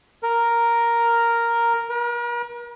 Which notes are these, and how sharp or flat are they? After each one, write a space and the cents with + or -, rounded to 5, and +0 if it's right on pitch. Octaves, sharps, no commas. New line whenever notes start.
A#4 +0
A#4 +45